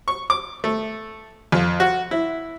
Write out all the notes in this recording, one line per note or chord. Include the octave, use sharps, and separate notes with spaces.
C#6
D6
A3
F2
F#4
E4